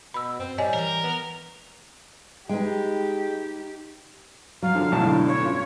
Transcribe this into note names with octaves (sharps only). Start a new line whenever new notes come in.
B2 B5 E6
F#2 C4
A2 G3 C#5 D#5 G#5
E3 A#4
B3
G#3 D#4 G4 B4 G5
F#3 F5
D3 F3
B1 A2 A5
D3
C#5
C#4 F4